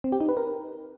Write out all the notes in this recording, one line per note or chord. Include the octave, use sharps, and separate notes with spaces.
C4
G4
D#4
B4
A#4